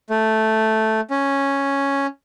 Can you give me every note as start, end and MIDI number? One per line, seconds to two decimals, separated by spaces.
0.10 1.01 57
1.10 2.07 61